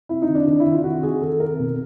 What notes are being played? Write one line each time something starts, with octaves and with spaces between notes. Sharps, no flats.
C3 E4
D#4
D#3
D4
D#3 D4
E4
D#3
F4
C3 F#4
D#3 G#4
D#3 A4
C3 A#4
B2